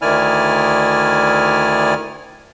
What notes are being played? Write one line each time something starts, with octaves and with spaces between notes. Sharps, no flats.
D2 D#3 E4 D5 G#5 F6